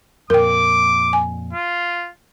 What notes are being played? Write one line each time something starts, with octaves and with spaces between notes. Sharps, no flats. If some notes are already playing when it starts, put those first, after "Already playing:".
F2 A#2 A#4 G5 D6
G#5
F4